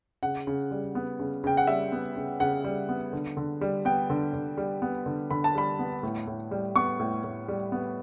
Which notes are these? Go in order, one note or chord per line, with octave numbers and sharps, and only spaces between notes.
C#3 F#5
C#3
G3
B3
C#3
C#3 G5
F#5
G3 E5
B3
C#3
C#3 F#5
G3
B3
D3
D3
G3
B3 G5
D3
D3
G3
B3
D3
D3 B5
A5
G3 B5
B3
A2
A2
G3
B3 C#6
A2
A2
G3
B3